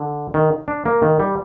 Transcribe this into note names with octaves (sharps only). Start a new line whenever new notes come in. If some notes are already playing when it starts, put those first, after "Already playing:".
Already playing: D3
D#3
D4
A#3
D#3
G3